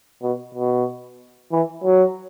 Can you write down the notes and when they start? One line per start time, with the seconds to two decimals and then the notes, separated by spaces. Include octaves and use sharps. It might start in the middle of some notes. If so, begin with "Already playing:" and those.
0.22 B2
0.55 B2
1.52 E3
1.84 F#3